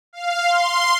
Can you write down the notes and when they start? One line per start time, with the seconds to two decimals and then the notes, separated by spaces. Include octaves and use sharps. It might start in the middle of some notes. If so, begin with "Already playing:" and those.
0.13 F5
0.46 C6